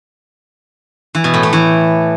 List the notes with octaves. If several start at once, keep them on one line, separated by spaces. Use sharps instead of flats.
E3
B2
A2
A3
E3